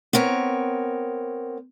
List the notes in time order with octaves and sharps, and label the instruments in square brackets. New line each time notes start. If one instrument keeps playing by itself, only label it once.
[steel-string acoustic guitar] B3 C4 A#4 C#5